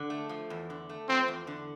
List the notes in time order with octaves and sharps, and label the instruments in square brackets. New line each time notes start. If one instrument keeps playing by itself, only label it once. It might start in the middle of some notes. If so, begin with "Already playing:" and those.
Already playing: [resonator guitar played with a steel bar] D3
A3
F3
E2
D3
A3
[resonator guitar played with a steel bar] F3 [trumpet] C4
[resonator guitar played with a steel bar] E2
D3